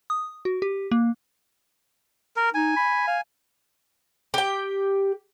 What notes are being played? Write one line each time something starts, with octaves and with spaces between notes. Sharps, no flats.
D#6
F#4
G4
A#3
A#4
D#4 G#5
B5
F5
G4 G5